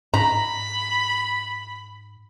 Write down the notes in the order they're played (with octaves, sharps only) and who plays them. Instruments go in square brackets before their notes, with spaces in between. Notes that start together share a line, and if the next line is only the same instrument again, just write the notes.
[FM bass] G#2 [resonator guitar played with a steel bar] A#5 [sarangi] B5